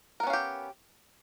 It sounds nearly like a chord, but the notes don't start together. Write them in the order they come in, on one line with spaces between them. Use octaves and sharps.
A#4 B3 C#4 F5 G4